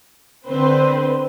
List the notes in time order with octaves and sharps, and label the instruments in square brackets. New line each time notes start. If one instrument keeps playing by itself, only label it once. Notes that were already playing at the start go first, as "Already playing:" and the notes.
[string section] D3 C4 B4 C5